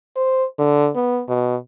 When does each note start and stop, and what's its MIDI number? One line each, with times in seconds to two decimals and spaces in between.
0.16 0.45 72
0.59 0.90 50
0.96 1.22 59
1.28 1.56 47